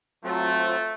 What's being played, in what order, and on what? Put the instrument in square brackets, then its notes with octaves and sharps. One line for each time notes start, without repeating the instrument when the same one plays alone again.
[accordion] F#3 C4 F4 [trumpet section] A3